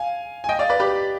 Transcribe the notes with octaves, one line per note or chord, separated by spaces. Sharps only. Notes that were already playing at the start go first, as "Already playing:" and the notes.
Already playing: F5 G#5
G#5
D#5 G5
D5 F5
B4 D5
G4 B4